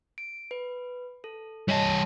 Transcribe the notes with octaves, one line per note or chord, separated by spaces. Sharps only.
D7
B4
A4
G3 C#5 D#5 A5